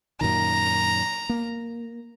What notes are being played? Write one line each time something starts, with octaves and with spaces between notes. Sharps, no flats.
F#2 A#2 D#3 A#5
A#3